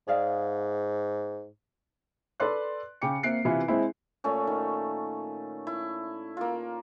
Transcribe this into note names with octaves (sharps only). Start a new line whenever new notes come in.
G#2 G#4 D5 F5
A4 B4 D5 C6 F#6
C#3 G5 D6 C#7
A#3 C4 E5 F#6 C7 D7
C3 E3 E4 F4 B4
G#3 C4 E4
A#2 A3 C#4
D#3
E4
A#3 F4